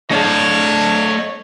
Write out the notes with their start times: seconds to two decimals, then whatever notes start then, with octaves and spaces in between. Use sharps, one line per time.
0.11 A3 D4 C5 C#5 D#5 F5